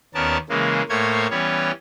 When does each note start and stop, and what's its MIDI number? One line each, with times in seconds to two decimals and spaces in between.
0.14 0.37 39
0.14 0.37 59
0.14 0.37 61
0.14 0.37 70
0.14 0.37 74
0.14 0.37 81
0.49 0.82 49
0.49 0.82 52
0.49 0.82 56
0.49 0.82 58
0.89 1.27 45
0.89 1.27 57
0.89 1.27 58
0.89 1.27 72
0.89 1.27 73
0.89 1.27 92
1.30 1.71 52
1.30 1.71 55
1.30 1.71 59
1.30 1.71 61
1.30 1.71 73